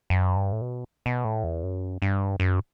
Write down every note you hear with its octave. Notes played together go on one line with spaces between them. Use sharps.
F#2
G2
A2
B2
B2
A2
E2
F#2
G2
F#2